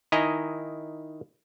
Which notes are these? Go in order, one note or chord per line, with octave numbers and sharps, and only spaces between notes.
D#3 E4 D#5 G#5 A#5